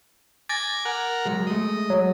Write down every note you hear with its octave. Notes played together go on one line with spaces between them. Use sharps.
G#5 D6 A6 A#6
A#4 F#5
F#3 G#3
G#3 A3 D#5
F#3